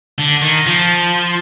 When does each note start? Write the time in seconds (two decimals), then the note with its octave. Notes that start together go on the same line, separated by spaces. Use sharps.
0.18 D3
0.42 D#3
0.67 F3